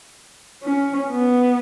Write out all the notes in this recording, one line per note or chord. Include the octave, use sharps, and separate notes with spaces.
C#4
B3